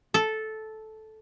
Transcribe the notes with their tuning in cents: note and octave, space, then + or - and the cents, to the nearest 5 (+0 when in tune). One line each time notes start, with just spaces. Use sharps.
A4 -10